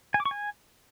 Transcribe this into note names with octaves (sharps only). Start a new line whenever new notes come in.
G#5
D6
C#6
G#5